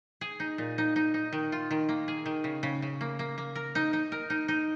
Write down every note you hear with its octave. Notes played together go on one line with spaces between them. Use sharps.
G#4
D#4
A#2
D#4
D#4
D#4
D#3
F4
D#3
A#3
G#4
D#3
C#3
C#3
C#3
A#3
A#3
A#3
A#4
D#4
D#4
A#4
D#4
D#4